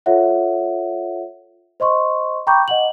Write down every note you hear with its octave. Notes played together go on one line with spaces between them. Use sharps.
F4 A4 C#5 E5 F#5
C5 D#5 C6 C#6
G5 A#5 B5 C#6 D6 G6
D#5 F#5 F#7